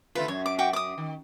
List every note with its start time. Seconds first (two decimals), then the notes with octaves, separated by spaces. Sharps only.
0.15 D3 A3 F4 B4
0.28 F#2 C#5
0.46 D6
0.59 F#4 G5 D6
0.73 D6 D#6
0.98 D#3